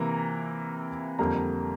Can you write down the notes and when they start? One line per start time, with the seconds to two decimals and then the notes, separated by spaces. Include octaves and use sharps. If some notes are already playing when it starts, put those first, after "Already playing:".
Already playing: C3 E3 A#3 A#5
1.19 F2 D3 G3 A#3 A#5